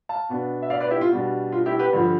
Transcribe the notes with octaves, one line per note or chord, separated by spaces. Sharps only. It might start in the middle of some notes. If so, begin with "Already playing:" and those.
F5 A5
B2 B3 D4
E5
D5 F5
B4 D5
E4 G4
F4
B2 G3 D4
F4
E4 G4
G4 B4
G2 D3 F3